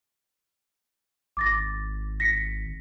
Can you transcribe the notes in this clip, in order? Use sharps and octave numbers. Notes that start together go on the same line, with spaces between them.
G#1 D6 A6 A#6
A#6 B6 C#7